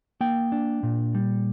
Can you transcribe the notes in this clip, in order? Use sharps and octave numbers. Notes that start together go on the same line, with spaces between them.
A#3 G5
D4
A#2
G3